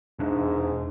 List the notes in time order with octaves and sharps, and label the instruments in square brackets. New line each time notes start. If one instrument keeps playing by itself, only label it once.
[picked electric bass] E1 D4 [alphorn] G#2